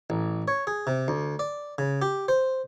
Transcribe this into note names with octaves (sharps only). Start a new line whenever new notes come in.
A1
C#5
G#4
C3
D2
D5
C#3
G4
C5